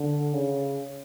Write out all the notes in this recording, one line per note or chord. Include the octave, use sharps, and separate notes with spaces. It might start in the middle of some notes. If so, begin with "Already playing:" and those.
Already playing: D3
C#3